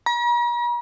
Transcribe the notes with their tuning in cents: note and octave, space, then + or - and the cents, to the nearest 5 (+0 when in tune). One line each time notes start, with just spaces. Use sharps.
A#5 +45